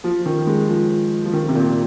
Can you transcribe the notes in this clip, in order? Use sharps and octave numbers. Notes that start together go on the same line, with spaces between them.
F3
D#3
G#3
F3
F3
D#3
C3
A#2